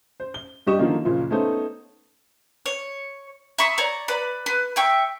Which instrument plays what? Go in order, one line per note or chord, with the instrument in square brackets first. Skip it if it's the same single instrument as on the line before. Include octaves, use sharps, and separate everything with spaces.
[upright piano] C5
G7
G2 G3 G4 D#5 C#6 E7
D3 D#3 F3 F#3 A#3
F#1 A#2 C#3 F3
A3 B3 C#4 D#4 A4 C5
[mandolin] C#5
E5 B5 C#6 D#6
C#5 D5 A#5 C#6
B4 D5 B5
B4
E5 G5 C#6